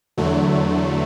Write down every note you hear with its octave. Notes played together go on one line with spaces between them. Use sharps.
E2 D3 F#3 A3